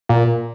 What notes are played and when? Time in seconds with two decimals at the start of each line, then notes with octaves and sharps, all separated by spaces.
0.09 A#2